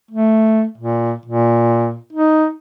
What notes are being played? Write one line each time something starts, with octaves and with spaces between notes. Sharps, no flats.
A3
A#2
A#2
D#4